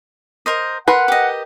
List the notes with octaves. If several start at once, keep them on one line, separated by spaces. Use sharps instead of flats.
A#4 C5 D#5
A#4 B4 F#5 C6
G4 D#5